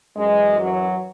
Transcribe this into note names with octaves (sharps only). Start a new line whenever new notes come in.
F#2 E3 G#3
F#3